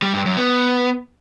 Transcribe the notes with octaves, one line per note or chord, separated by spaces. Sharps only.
G3
G2
F#2
B3